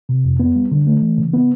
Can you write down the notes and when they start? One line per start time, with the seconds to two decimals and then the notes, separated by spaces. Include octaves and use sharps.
0.09 C3
0.25 F2
0.40 B3
0.56 G3
0.72 D3
0.87 A3
1.02 E3
1.18 C#3
1.34 B3